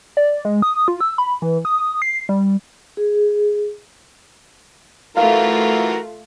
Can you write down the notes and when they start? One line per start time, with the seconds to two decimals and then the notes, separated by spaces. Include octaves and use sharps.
0.17 D5
0.45 G#3
0.62 D#6
0.88 F4
1.01 E6
1.18 B5
1.42 E3
1.65 D#6
2.02 C7
2.29 G3
2.97 G#4
5.17 E3 A3 F4 F#4 A#4 F5